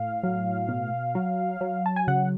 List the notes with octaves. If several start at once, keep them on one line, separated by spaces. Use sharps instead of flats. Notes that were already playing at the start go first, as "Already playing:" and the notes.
Already playing: A2 F5
F#3
B2
F#3
F#3
A5
G#5
C#3 F#5